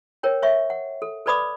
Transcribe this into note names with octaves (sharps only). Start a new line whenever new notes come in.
A#4 C#5 G5
C#5 E5 C#6
F#5
A4
A4 B4 D5 B5 D6 D#6